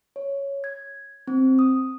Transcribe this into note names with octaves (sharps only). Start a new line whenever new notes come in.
C#5
G#6
C4
D#6